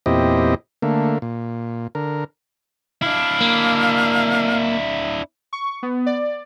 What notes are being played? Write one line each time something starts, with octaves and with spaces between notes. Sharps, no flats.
E2 A#2 C4 E4 G4 D#5
D3 A3 A#3
A#2
D3 A#4
D4 E4 F5
A#3
C#6
B3
D5